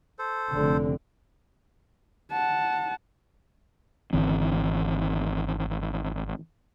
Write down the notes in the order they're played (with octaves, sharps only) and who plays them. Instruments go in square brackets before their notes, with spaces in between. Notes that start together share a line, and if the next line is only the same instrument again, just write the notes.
[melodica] A4 C5
[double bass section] F1 C4 [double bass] D3
[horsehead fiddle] F#5 A5
[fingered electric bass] G#1 D3 E3 C4